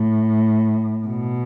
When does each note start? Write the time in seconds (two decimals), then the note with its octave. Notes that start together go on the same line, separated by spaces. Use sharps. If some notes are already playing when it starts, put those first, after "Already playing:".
Already playing: A2
1.08 B2